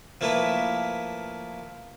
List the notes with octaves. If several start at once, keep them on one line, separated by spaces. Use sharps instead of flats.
F3 A3 A#3 E4 B4